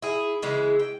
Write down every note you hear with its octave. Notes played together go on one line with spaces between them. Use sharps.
E4 G#4
C#3 E3 G#3 E4
G5